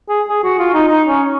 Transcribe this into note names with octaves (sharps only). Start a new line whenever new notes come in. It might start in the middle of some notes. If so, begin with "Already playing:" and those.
G#4
G#4
F#4
F4
D#4
D#4
C#4